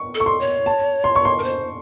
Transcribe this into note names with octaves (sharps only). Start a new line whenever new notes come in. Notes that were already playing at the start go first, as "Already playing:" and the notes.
Already playing: C#6
A4
C#6
C6
C#5
A5
C6
C#6
C6
A#4
C5